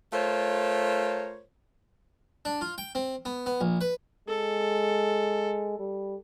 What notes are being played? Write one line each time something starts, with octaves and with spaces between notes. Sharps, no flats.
A3 F4 A#4 C5 C#5
D4
F4
G5
C4
B3
B3
A#1
B4
G#3 A4
G3